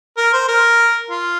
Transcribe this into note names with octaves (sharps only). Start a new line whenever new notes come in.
A#4
C5
A#4
F4